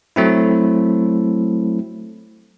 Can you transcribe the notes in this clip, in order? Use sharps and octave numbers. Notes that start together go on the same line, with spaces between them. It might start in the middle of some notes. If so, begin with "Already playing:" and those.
F#3 A3 C4 E4